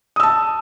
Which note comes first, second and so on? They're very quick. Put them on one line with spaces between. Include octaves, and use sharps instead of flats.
D#6 E6 A5